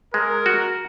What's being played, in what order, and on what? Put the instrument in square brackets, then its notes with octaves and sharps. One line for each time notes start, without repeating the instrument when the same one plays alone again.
[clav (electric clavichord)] G#3 [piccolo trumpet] A#4
[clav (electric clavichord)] F#4